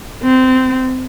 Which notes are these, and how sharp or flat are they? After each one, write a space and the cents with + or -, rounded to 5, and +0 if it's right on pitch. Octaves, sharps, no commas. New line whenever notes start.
C4 -20